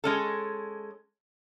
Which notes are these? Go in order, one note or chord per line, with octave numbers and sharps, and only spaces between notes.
G#3 C#4 A4